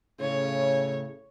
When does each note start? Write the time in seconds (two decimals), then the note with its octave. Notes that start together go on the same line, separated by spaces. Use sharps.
0.20 A2 C#3 C#5